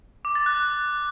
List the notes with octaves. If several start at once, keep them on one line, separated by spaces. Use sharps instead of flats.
D6
A6
F#6